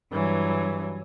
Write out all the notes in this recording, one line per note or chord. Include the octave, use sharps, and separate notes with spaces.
G2 E3 F#3